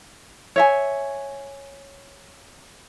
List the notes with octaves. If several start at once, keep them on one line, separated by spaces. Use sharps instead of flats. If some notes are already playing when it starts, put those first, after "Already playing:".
C#5 E5 G#5